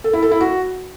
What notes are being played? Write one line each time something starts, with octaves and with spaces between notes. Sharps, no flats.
A4
E4
A4
E4
F#4